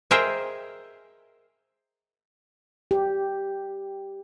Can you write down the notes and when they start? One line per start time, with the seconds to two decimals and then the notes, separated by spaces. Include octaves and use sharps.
0.11 G#4 A#4 C5 D#5 E5 G5
2.91 G4